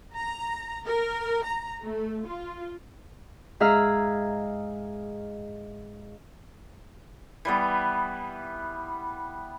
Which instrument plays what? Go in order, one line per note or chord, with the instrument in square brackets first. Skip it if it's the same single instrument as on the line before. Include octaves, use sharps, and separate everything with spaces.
[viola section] A#5
A#4
A#5
A3
F4
[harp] G#2 G#4 E5 F5 A#5 F6
[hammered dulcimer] E3 G3 B3